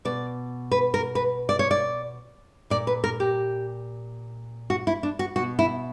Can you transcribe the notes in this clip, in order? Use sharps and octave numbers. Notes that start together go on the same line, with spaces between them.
B2 D5
B4
A#4
B4
D5
C#5
D5
A#2 D5
B4
A#4
G4
F#4
E4
D4
F#4
B2 F#4
E4